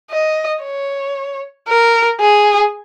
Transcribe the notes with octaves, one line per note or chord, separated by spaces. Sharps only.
D#5
C#5
A#4
G#4